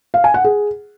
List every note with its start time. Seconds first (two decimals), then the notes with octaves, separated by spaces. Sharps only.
0.14 F5
0.24 G#5
0.34 F#5
0.44 G#4